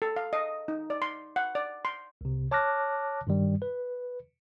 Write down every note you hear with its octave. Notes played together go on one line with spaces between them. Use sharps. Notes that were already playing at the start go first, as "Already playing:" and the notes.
A4
F5
D#5
D#4
D5
C6
F#5
D5
C6
C2 C3
C#5 A5 D6 F6 F#6 A#6
G2 D#3 G3
B4